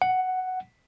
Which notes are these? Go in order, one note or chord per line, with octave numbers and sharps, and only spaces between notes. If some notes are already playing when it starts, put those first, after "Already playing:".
F#5